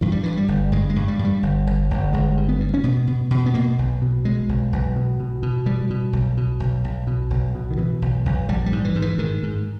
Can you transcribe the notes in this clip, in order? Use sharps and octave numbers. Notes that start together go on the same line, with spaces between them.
G2 E3
G3
G2 E3
G3
G1
G2 G#3
G#3
G2
G3
G2
G3
G1
G1
G1
G1 G#3
G2
B3
G2
C#4
B2 B3
B2
B2
B3
B2 A#3
B1
B2
B2 G#3
B1
B1
B2
B2
B2
B2 G3
B2
B1
B2
B1
B1
B2
B1
B2
D#3
B2 E3
B1
B1
A#1 G3
G3
G#2
E3
G#2
E3
G#2 D#3
G#2